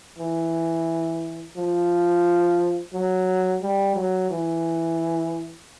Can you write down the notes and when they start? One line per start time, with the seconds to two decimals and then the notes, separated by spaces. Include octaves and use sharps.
0.18 E3
1.57 F3
2.94 F#3
3.62 G3
3.96 F#3
4.31 E3